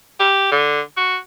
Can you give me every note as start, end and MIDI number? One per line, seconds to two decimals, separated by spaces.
0.20 0.51 67
0.52 0.81 50
0.97 1.17 66